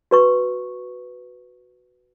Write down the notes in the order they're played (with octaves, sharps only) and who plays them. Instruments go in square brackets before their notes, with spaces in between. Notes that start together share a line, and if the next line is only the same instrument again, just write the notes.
[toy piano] F#4 B4 C#6